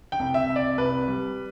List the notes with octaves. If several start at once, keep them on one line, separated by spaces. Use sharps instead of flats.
G5
C2
E5
C2
D5
C2 B4
G3